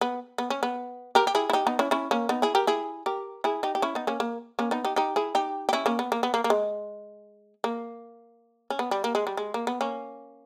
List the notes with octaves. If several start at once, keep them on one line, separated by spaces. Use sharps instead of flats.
B3
B3
C#4
B3
G4 A#4
G4
E4 G#4
E4
D#4 G4
B3 D#4
C#4 E4
C#4 E4
A#3 C#4
B3 D#4
E4 G#4
G4 A#4
E4 G#4
G4 A#4
E4 G#4
D#4 G4
G4
C#4 E4
B3 D#4
A#3 C#4
A#3
A#3 C#4
B3 D#4
D#4 G4
D#4 G4
E4 G#4
D#4 G4
G4
C#4 E4
A#3 C#4
B3
A#3
B3
A#3
A#3
G#3
A#3
C#4
B3
G3
A#3
G#3
G3
G#3
A#3
B3
A#3 C#4